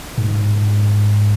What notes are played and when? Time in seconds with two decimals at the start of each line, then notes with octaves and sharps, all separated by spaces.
0.18 G#2